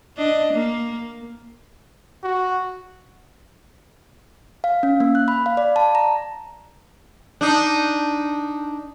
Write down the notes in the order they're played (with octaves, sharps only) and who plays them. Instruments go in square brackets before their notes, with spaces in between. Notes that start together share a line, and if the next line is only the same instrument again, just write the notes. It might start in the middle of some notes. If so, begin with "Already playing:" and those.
[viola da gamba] D4 D#5
A#3
[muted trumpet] F#4
[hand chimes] F5
C#4
A#3
F#6
B5
F5
D5
A5
A#5
[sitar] D4 D#4